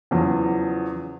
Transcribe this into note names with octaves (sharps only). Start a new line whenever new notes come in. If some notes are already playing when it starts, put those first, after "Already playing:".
E2 C#3 F3 F#3